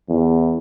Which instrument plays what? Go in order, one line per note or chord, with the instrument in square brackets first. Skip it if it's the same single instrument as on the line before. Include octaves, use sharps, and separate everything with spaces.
[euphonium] E2